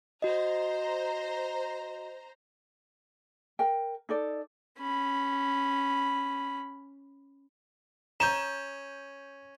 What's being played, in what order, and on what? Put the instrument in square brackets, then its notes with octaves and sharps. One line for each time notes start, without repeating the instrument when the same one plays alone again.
[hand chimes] F#4 D#5 [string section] C5 A#5
[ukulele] A#4 G5
D#4 A4 D5
[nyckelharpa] C#4 B5
[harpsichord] C#4 [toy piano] A#5 [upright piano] G6 E7